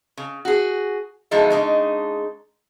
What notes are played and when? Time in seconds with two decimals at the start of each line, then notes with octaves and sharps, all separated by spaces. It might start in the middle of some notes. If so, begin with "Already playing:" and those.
0.17 C#3
0.45 F#4 G#4
1.31 B2 F3 G#3 D#4 E4 A4
1.50 C#3 G#3 D4 D#4